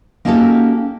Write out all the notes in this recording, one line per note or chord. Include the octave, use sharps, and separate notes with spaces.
A#3 C#4 D#4 F#4 G4 A4